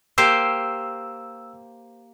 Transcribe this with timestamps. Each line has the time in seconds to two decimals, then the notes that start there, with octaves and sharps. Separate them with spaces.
0.18 A#3 G4 C5 E6